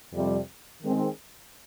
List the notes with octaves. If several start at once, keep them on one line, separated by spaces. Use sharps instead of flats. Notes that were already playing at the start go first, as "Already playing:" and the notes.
F2 C3 G3
D#3 G#3 C4